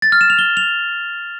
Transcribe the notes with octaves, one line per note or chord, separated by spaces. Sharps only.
A6
F6
E7
F7
G7
F7